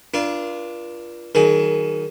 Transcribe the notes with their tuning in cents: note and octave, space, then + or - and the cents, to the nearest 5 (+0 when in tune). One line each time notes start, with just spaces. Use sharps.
D4 +0 F4 -20 A#4 +45
D#3 +0 F#3 +35 G#4 +20